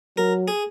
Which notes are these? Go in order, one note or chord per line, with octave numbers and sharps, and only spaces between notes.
F#3 A#4
G#4